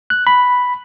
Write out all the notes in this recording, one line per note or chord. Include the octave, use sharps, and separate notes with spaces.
F#6
B5